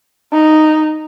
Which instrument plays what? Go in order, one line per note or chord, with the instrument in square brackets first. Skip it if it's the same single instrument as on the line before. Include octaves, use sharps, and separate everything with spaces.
[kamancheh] D#4